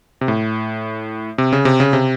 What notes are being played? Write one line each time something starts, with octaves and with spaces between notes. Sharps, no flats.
C3
A2
C3
C#3
C3
C#3
C3